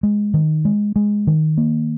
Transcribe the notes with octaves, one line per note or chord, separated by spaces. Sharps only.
G#3
D#3
G#3
G#3
D#3
A#3